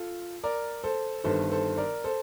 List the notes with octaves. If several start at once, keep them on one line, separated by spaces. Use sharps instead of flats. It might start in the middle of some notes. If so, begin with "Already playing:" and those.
Already playing: F4 A4
A#4 D5
A4 C5
G1 G2 D#3 A4 C5
A4 C5
A#4 D5
A4 C5